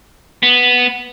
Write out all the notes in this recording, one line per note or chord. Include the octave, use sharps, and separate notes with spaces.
B3